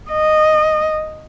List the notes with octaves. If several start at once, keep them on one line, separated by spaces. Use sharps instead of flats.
D#5